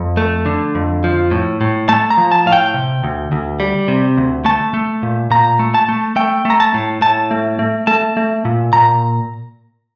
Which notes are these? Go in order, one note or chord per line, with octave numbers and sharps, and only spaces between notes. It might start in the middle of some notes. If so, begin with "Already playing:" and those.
Already playing: F2
A3
D3
F2
F3
A2
A2
A3 A5
A#5
F3
A5
A2 F5
G5
C3
D2
D2
G3
C3
D2
A3 A5
A3
A#2
A#2 A#5
A3
A5
A3
A3 G5
A3 A#5
A5
A2
A2 A5
A3
A3
A3 A5
A3
A#2
A#2 A#5